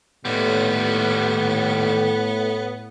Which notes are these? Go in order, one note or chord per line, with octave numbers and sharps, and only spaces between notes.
D#2 A2 G3 B3